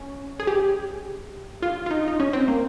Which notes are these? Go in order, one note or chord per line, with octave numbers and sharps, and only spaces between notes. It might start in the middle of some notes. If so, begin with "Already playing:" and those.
Already playing: C#4
G#4
G4
F4
F4
D#4
D#4
C#4
C4
A#3